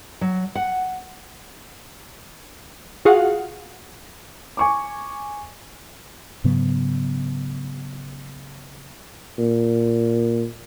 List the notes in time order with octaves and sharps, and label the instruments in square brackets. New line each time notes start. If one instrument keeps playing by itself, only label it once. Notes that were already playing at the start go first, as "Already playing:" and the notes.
[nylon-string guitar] F#3
F#5
[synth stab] F4 F#4 G#4 F5 F#5
[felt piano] G#5 C#6 D6
[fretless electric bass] G#2 C#3 F#3 B3
[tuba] A#2